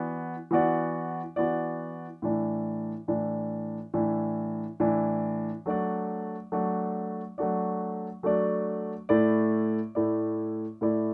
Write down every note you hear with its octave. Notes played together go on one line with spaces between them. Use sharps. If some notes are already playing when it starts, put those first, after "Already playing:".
Already playing: E3 B3 F#4 D5
E3 B3 F#4 D5
E3 B3 F#4 D5
A2 E3 D4
A2 E3 D4
A2 E3 D4
A2 E3 D4
F#3 A3 D4 F#4 D5
F#3 A3 D4 F#4 D5
F#3 A3 D4 F#4 D5
F#3 A3 D4 F#4 D5
A2 A3 E4 D5
A2 A3 E4 D5
A2 A3 E4 D5